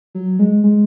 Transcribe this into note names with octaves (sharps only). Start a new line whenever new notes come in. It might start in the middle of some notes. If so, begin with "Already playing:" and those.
F#3
G#3
G#3